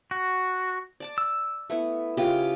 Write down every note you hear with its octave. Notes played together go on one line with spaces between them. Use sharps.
F#4
D5 A5 D6
E6
A3 B3 E4
C#3 F4 G4 G#4